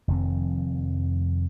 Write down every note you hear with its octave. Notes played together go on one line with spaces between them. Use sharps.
F1 F2 D#3 C4